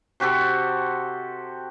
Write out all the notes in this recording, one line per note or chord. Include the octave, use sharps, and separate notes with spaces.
C3 F#4 G4 A4